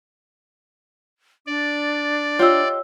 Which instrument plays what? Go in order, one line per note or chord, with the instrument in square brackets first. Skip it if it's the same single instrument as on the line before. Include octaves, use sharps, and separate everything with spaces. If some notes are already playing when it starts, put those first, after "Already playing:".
[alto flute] D4 [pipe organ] D5
[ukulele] F4 G4 D#5 [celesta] C#5 E6